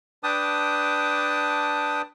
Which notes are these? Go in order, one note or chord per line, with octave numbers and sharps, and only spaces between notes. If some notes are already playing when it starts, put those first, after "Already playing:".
D4 B4 G5 A5 D6 D#6